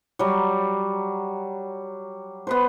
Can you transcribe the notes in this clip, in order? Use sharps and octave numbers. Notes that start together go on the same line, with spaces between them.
F#3 G3
B3 B4 C5